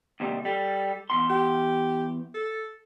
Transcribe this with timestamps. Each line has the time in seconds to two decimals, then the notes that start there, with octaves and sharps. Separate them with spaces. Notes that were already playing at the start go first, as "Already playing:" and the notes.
0.20 D#2 C3 G3
0.45 G3 A4
1.10 E2 G#2 C6
1.30 G4
2.34 A4